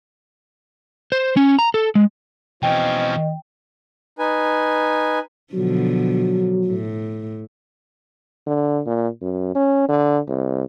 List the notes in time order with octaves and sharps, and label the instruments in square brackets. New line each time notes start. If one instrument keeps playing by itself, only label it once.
[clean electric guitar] C5
C#4
A#5
A4
G#3
[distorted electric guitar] B2 E3 [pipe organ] F3 C4 C#4 [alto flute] D#5 [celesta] G5
[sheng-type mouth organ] D#4 B4 G#5
[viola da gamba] B2 D3 F3 [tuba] F#3
[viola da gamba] A2
[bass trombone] D3
A#2
F#2
C#4
D3
C2